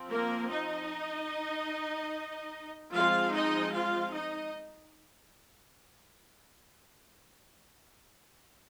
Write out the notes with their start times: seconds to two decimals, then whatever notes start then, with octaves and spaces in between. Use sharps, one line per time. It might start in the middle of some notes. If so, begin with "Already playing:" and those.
Already playing: F3 C4
0.11 A#3 A#4
0.51 D#4 D#5
2.93 F3 G#3 C4 F4 F5
3.33 D#4 D#5
3.74 F4 F5
4.13 D#4 D#5